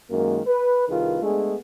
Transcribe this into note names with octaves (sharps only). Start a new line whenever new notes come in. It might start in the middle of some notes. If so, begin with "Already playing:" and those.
F#2 D#3 G#3 A#3
B4
C2 D#3 F4 G#4 B4
G#3 A3 B3 D4 G#4